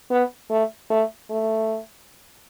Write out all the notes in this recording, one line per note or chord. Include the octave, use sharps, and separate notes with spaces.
B3
A3
A3
A3